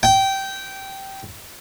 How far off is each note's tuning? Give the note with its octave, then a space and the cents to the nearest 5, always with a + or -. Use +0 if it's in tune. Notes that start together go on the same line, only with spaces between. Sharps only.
G5 -15